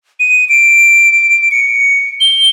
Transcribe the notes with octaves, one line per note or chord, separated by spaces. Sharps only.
D#7
D7
C#7
G7